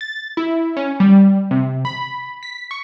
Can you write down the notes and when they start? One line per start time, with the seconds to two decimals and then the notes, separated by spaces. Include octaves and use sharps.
0.01 A6
0.37 E4
0.77 C#4
1.00 G3
1.51 C3
1.85 B5
2.43 B6
2.71 C#6